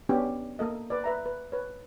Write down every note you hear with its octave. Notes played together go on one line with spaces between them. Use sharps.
B3 C#4 D4 G4
A#3 A4 D#5
B4 D5
B4 E5 A#5
B4
B4 C#5